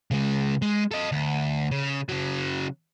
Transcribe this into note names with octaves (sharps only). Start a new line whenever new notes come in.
C#3 G#3
G#3
A4 D#5
D2
C#3
C#3 F#3